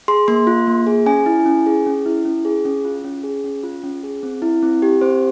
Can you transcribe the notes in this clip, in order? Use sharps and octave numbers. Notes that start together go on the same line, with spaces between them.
G#4 C6
A#3 C6
F4
A#3
G#4
C#4 G#5
E4
C#4
G#4
C#4
E4
C#4
G#4
C#4
F4
C#4
G#4
C#4
F4
C#4
G#4
C4
E4
C4
G4
C4 C5